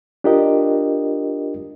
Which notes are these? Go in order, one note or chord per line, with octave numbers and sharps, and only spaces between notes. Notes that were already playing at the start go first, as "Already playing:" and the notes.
D4 F4 G4 A#4 D#5